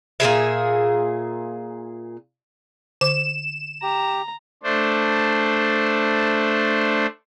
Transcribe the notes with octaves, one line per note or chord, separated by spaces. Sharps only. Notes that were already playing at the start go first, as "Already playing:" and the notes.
A#2 E3 G#4 E5
D3 C5 D6 E7
G4 A#5
A3 D4 C5